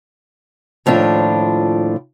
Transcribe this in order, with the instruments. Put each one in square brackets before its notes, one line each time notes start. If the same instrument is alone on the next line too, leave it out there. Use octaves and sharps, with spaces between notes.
[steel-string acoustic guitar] D#2 A2 F3 D4 F4